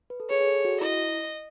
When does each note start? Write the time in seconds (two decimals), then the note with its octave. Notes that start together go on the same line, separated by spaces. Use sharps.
0.10 B4
0.20 A4
0.30 G#4 C#5
0.41 G#4
0.47 A4
0.65 F#4
0.81 E4 D#5